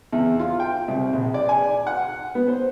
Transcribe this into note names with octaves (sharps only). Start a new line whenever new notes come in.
E2
F4
G5
C2
A#1
D5
G#5
F#5
B3
C5